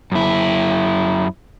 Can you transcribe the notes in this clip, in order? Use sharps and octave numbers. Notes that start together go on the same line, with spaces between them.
F#2 E4